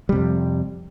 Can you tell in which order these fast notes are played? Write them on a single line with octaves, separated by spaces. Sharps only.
G3 C3 F2